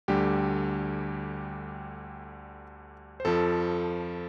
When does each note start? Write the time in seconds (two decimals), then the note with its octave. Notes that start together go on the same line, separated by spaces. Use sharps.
0.08 D2 D3 G3 G4
3.20 C5
3.25 F2 F3 A4